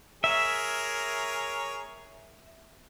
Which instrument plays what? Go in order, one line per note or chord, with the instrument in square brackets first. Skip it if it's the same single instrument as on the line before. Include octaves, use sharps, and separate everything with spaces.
[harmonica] G#4 A#4 C#5 [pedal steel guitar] E5